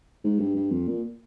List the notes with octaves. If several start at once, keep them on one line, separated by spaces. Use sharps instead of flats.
G#2
G2
G2
F2
A#2